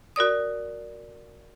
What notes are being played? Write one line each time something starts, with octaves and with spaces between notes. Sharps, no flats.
F#4 A#4 D5 D#6